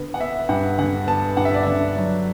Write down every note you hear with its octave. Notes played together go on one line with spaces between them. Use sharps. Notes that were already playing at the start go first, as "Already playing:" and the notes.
Already playing: D3 B3
F#5
B3 E5
G2 F#5
D3 F#5
B3 A5
G2 F#5
E5
D5
D3 E5
F#3